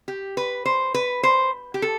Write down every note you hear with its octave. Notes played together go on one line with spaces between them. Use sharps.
G4
B4
C5
B4
C5
G4
A4